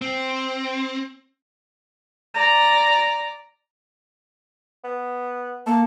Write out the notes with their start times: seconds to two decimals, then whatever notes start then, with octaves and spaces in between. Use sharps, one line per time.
0.02 C4
2.34 D5 A#5
4.84 B3
5.67 A#3 A4